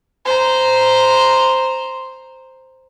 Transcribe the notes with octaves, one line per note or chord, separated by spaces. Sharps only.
C5 A#5